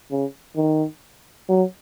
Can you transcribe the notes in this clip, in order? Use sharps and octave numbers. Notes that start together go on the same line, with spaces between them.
C#3
D#3
F#3